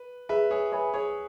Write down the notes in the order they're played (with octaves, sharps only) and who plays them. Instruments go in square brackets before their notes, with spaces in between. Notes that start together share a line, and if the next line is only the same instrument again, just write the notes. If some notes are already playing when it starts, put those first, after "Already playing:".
Already playing: [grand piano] B4
[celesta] G#4 [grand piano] B4 E5
[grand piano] G#4 C#5
[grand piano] G#4 C#5 [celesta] B4 E5 G#5 B5
[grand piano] G#4 C#5